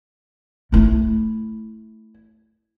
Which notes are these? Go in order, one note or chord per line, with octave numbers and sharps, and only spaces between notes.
A3 E4